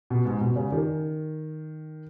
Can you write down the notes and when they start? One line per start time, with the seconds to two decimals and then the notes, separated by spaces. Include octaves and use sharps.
0.10 B2
0.25 G#2
0.41 B2
0.56 C#3
0.72 D#3